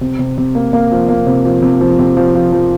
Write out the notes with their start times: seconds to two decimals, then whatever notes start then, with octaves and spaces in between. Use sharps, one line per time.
0.01 C3
0.19 C3
0.38 C3
0.55 A#3
0.73 A#3
0.91 F3
1.09 A#3
1.27 C3
1.45 F3
1.62 C3
1.81 F3
1.99 C3
2.17 F3
2.35 F3
2.52 F3